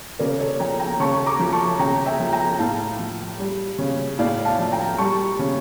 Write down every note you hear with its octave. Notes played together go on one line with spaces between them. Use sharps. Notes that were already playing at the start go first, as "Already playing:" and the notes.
C#3 A#4 D5
A4 C#5
F3 G5 A#5
G5 A#5
C#3 A5 C#6
A#5 D6
F3
A5 C#6
C#3 G5 A#5
E5 G5
F3
G5 A#5
A2 F5 A5
F3
G3
C#3
A2 D5 F5
F5 A5
F3
G5 A#5
G3 A5 C#6
C#3